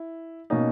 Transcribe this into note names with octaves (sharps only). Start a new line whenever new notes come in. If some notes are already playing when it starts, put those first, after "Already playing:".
Already playing: E4
B2 A#3 C#4 D#4